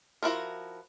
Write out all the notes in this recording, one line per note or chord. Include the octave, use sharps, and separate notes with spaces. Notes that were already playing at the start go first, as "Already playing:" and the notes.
F3 E4 F#4 A#4